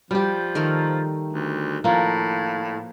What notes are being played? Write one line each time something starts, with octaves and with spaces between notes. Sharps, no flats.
F3 G3 G4
D#3 A3 A#4
D2
A2 F3 A#3